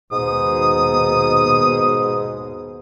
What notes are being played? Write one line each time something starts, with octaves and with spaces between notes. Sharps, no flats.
D#2 G#2 B2 D#6